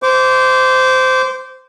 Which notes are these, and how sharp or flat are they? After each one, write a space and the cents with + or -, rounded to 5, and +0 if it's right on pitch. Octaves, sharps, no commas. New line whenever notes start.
C5 -15 D6 -25